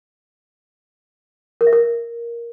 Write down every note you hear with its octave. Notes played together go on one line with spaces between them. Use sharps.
A#4
E5
A#4